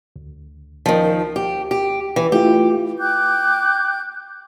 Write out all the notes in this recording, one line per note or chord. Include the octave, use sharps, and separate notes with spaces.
D2
D#3 F3
G4
G4
E3
A3 E4 F4 G4
G5 D6 F#6 G6